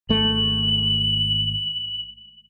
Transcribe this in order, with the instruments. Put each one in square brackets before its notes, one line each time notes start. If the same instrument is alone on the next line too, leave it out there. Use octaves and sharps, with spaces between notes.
[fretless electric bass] G#1 A3 [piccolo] F#7